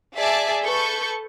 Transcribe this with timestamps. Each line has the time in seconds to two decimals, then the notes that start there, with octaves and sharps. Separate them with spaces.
0.16 G#4 D5 E5 G#5 A5
0.65 A4 B4 C#6 G6